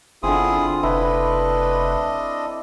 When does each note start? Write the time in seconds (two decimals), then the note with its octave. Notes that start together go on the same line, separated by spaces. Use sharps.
0.23 G1 D3 C4 E4 F4 G#4 D#6
0.83 F1 D4 E4 A4 B4 D#5